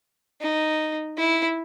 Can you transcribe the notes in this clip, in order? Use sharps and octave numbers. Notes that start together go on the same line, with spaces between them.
D#4
E4